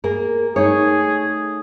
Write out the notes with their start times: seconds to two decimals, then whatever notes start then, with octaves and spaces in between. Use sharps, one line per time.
0.04 A#3 G#4 A#4
0.56 A3 D#4 G#4 C#5